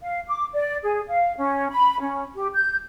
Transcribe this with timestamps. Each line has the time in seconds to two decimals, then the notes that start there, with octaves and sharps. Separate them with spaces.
0.02 F5
0.28 D6
0.53 D5
0.82 G#4
1.07 F5
1.37 C#4
1.69 B5
2.00 C#4
2.35 G4
2.54 G6